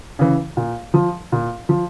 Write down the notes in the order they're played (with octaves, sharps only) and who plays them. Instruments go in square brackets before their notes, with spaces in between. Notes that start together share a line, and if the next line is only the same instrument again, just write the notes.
[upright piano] C#3 E3
A#2
F3
A#2
F3